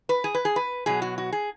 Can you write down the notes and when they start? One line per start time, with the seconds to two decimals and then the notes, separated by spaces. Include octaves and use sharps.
0.09 B4
0.24 G#4
0.34 B4
0.45 G#4
0.56 B4
0.86 B2 F#3 G#4
1.02 F#4
1.18 F#4
1.32 G#4